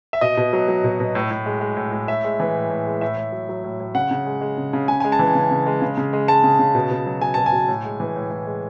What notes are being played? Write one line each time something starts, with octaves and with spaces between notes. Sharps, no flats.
E5
B2 D#5
B2
F#3
F#3
B2
B2
A2
A2
G#3
G#3
A2
A2
A2 E5
G#3
E3
A2
A2
G#3
A2 E5
A2
F#3
F#3
A2
A2
C#3 F#5
C#3
G#3
G#3
C#3
C#3
C#3 G#5
G#3 G#5
A5
E3
C#3
C#3
G#3
C#3
C#3
G#3
G#3 A5
C#3
C#3
B2
B2
F#3
F#3 G#5
B2 A5
G#5
B2
A2
G#3
E3
A2
A2
G#3